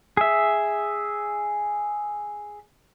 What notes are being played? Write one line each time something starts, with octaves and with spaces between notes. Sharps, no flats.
G#4 E5